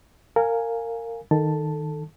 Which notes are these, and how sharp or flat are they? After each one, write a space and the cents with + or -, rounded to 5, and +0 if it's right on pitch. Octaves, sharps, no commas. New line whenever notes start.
A#4 -25 F5 +0 G#5 +0
D#3 -5 A4 +0 A5 +0